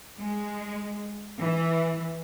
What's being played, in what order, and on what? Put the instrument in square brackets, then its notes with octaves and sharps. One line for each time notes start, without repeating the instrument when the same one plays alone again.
[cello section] G#3
E3